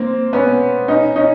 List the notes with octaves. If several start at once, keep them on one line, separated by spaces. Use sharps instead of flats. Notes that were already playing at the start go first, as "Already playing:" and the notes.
Already playing: A#3 C4
B3 C#4
C#4 D#4
C#4 D#4